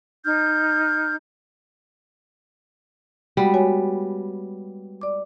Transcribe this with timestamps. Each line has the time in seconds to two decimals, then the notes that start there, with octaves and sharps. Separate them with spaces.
0.25 D#4 F6 G6
3.37 G3 G#3 B3 F#4
3.54 F#4 C#5 G#5
5.01 D5 D6